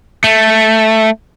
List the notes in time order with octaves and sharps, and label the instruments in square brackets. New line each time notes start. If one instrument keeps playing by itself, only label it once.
[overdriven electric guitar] A3